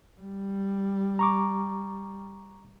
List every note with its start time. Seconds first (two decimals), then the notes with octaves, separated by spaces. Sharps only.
0.21 G3
1.19 A#5 C#6 D6